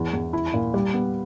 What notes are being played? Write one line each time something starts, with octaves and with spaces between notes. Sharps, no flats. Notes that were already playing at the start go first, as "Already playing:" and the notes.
Already playing: E2
E2
E4
A#2
G3
B3